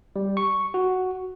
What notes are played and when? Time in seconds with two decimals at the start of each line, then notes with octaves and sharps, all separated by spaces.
0.16 G3
0.37 C#6
0.74 F#4